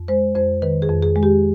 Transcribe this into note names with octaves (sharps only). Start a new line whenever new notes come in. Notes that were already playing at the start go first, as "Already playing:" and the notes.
Already playing: F2
G#3 C5
F2 C5
D#3 B4
G#4
F2
G#4
G#3
G4